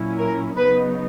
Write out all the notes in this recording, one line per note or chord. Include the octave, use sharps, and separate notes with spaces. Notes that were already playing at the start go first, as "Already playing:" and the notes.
Already playing: A#2 F#3 C#4 E4
A#4
C#3 F#3 B3 D#4 B4